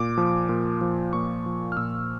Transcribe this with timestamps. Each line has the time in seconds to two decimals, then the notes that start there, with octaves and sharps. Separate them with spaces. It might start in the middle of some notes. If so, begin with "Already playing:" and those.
Already playing: A#2 D6
0.18 F3
0.49 A#2
0.81 F3
1.13 A#2 C#6
1.46 F3
1.72 F6
1.77 A#2 E6